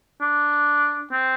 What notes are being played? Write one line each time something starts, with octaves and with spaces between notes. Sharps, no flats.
D4
C4